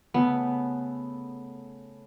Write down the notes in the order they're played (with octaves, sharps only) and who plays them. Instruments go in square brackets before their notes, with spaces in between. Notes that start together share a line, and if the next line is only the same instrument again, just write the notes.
[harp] C#3 A3 [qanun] B3